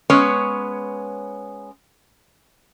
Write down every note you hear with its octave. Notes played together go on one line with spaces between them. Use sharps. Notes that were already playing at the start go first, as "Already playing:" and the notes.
G#3 B3 C#4 B4 C#5